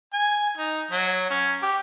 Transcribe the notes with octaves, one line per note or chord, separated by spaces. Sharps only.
G#5
D#4
F#3
C#4
G4